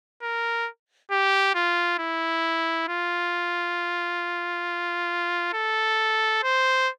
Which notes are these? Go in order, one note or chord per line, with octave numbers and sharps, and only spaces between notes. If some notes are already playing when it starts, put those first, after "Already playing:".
A#4
G4
F4
E4
F4
A4
C5